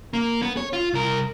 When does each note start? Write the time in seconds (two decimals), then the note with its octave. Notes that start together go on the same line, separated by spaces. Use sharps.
0.13 A#3
0.42 B3
0.57 C#5
0.73 F4
0.93 C2 A#4